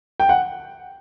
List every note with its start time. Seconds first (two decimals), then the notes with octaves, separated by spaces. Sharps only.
0.20 G5
0.29 F#5